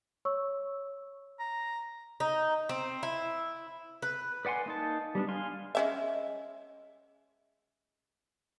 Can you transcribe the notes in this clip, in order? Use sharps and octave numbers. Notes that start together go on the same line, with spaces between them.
C#5 C#6 E6
A#5
D#4
C4
E4
B4
B4 D5 F#5 G#5 C6
A#3 D#4 A5
G3 B3 C#4 D4
F5 G#5 C6
G#3 C#4 E5